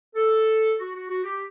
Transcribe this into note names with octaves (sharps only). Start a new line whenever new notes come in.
A4
F#4
F#4
F#4
G4